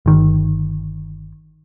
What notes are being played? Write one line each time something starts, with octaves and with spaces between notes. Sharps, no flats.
G1 D#3